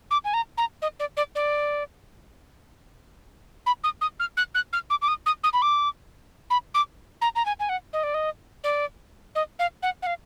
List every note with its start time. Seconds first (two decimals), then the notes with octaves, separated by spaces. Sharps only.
0.11 D6
0.24 G#5
0.34 A#5
0.58 A#5
0.82 D#5
1.00 D5
1.17 D5
1.35 D5
3.66 B5
3.84 D#6
4.01 D#6
4.20 F6
4.37 F#6
4.55 F#6
4.73 F6
4.90 D6
5.02 D6
5.08 D#6
5.26 D#6
5.44 D#6
5.53 B5
5.62 D6
6.50 B5
6.74 D6
7.21 A#5
7.35 A#5
7.45 G#5
7.60 G#5
7.69 F#5
7.93 D#5
8.03 D5
8.14 D#5
8.64 D5
9.35 D#5
9.59 F5
9.83 F#5
10.02 F#5
10.06 F5